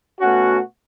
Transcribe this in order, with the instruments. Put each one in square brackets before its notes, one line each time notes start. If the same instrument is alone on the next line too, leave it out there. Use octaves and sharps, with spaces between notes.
[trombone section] B2 A3 C#4 F#4